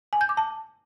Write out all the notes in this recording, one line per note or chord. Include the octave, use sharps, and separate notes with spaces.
G#5
G6
D6
A5